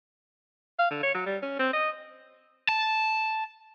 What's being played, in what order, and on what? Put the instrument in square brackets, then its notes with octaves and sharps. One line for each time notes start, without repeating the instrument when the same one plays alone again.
[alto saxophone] F5
D3
C#5
F#3
G3
C#4
C4
D#5
[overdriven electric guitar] A5